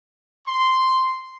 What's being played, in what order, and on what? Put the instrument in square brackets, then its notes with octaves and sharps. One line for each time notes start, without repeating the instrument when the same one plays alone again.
[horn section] C6